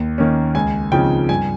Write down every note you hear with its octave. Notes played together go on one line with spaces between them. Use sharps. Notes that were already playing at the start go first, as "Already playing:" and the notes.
Already playing: D#2
D#3 A#3 C#4
C#2 G#5
C#3 F3 C4 D#4 G5
G2 G#5